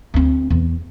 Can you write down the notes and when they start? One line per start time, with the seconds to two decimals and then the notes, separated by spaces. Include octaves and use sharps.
0.14 D2 C4
0.50 E2